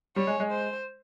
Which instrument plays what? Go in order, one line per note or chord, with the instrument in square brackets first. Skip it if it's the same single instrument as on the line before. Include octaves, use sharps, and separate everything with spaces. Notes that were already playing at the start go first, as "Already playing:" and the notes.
[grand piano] G3 [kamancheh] C#5
[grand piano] G#3
G#3
[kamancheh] C5